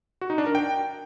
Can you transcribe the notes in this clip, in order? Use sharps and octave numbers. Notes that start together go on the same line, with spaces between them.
F#4
D#4
D4
A#4
G5